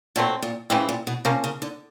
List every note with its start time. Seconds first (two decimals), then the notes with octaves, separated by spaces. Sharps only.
0.16 A#2 D3 F#3 A3 C4
0.42 A#2
0.70 A2 C#3 E3 G3 C4
0.89 A#2
1.07 B2
1.25 C3 F3 A#3 C#4
1.44 C#3
1.62 D3